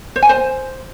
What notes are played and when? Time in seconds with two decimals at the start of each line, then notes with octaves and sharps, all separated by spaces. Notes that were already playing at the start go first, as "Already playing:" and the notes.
0.16 C5
0.22 G#5
0.29 C5